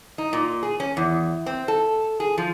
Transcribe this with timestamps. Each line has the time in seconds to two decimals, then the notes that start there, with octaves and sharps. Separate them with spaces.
0.18 D#4
0.33 A#2
0.63 G#4
0.80 C#4
0.97 E2
1.46 C4
1.68 A4
2.20 G#4
2.38 F3